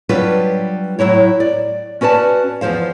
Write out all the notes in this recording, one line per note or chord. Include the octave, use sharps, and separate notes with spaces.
F#3 G3 D4 F4 B4
A2 F#3 E4 C#5
D5
C#4 F#4 B4 D5 A5
E2 C#3 F3 C5 F5